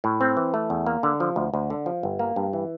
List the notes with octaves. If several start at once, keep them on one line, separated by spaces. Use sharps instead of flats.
A2
C4
E3
A3
E2
A#3
D3
F3
D2
D2
D3
F3
G1
A#3
G2
E3